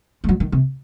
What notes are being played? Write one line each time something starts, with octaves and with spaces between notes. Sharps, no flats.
G#3
F#3
D#3
C3